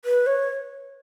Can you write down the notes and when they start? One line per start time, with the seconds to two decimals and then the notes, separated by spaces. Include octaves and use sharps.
0.05 B4
0.27 C#5